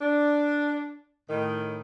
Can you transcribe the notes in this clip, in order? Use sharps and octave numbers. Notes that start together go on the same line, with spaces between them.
D4
A2 D#3